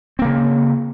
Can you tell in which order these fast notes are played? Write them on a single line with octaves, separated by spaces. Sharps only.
C4 A#3 C#3